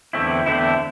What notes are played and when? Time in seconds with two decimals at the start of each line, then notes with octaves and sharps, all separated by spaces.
0.13 E2 D3 A3 C4 E4
0.46 E2 D3 A3 C4 E4